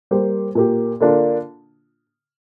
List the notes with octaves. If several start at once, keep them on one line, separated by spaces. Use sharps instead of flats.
G3 A#3 G4 C5
A#2 A#3 G4
D3 A#3 D4 F4